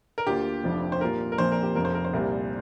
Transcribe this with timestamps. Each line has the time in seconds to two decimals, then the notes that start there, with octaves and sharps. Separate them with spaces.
0.18 A#4
0.27 D2 D3 A#3 F4 G4
0.64 F1 F2 F3 D4
0.92 C5
1.01 A#2 G3 A#3 F4 A#4
1.32 A#4
1.38 A#1 A#2 F3 C4 C5
1.52 A#4
1.63 G4
1.75 F1 F2 F3 A#4
1.85 C5
1.95 A#4
2.05 C5
2.13 C2 A#2 G3 A#4